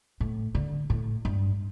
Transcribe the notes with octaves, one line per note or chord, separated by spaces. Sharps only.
A2
D3
A2
G2